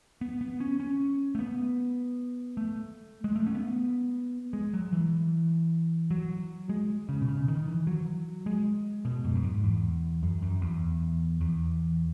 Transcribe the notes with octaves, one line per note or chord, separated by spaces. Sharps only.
B3
B3
C#4
C#4
A3
B3
A3
G#3
A3
C#4
B3
G#3
F#3
E3
F#3
G#3
C#3
B2
C#3
D#3
E3
F#3
G#3
B2
F#2
F#2
G#2
E2
F#2
F#2
E2
E2